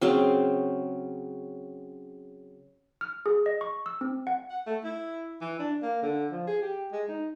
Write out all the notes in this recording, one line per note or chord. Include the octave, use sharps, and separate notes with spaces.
C#3 F#3 C4
F6
G#4
D#5
C#6
E6
C4
F#5
F#5
A3
E4
E3
D4
A#3
D3
F3
G#4
G4
G#3
D#4